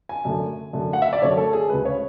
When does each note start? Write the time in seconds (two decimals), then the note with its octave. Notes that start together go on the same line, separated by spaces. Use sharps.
0.09 G#5
0.25 F#2 D3 A3
0.73 F#2 D3 A3
0.93 F#5
1.02 E5
1.13 D5
1.22 F#2 D3 A3 C#5
1.38 A4
1.53 G#4
1.69 D2 C#3 G#3 B4
1.85 C#5